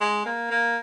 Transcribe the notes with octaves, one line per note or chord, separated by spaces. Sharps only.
G#3
A#3
A#3